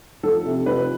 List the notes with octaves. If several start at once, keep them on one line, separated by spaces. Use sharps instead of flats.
F3 A4
C3
F3 B4